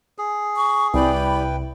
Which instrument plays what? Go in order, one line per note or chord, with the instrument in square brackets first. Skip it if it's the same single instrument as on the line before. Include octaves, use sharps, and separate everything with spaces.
[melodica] G#4
[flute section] C#6
[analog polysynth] C2 [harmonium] E4 B4 G5 [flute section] G4 D5 B5